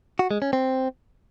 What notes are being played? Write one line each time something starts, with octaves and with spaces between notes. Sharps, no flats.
F#4
G#3
C#4
C4